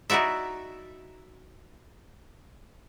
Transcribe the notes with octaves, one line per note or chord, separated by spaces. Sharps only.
D#4 E4 F#4 D5 E5